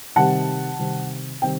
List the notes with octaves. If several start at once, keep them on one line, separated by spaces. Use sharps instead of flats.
C3 D#3 G3 C4 F#5 A5
C3 D#3 G3 C4
C3 D#3 G3 C4 G5